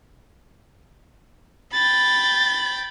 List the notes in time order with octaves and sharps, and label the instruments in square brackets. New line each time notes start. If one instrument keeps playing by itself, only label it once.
[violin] G5 B5 [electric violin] A6